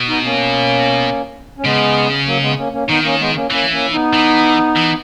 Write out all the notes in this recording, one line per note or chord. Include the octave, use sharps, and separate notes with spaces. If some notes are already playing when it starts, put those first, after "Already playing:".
Already playing: B2
B3 D#4
A#3 C#4
C#4
C#3 G#3 B3
F#3 A#3
G#3 B3
A#3 C#4
A#3 C#4
D#3 B3 D#4
A#3 C#4
G#3 B3
A#3 C#4
E3 A#3 C#4
A#3 C#4
B3 D#4
E3
E3